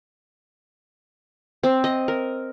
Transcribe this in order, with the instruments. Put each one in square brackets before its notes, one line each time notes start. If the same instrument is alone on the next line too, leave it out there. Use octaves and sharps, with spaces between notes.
[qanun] C4
D#5
A#4